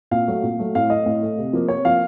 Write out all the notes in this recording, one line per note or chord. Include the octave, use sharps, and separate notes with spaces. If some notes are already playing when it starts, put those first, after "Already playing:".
A#2 F5
F#3 A3
A#2
F#3 A3
A2 F5
A3 D#5
A2
A3
C3
F3 A#3
C3 C#5
F3 A#3 F5